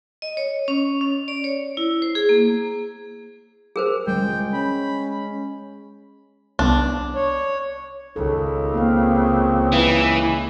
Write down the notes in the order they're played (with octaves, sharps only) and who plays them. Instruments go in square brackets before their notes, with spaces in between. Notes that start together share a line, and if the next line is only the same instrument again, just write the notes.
[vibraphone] D#5
C#5
C#4
C#4
D5
C#5
E4
C5
G#4
A#3
[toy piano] G#4 A#4 C5
[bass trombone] C#2 [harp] G#3 [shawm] G5
[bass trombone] C#4 [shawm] B5
[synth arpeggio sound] C2 B3 [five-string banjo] D4
[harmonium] C#5
[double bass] C#2 [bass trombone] D#3 [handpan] A4
[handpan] A#3 F5 [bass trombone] C4
[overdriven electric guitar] E3